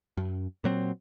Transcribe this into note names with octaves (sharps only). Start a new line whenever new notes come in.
F#2
A#2 F#3 C4